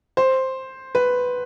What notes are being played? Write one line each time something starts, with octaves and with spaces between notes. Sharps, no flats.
C5
B4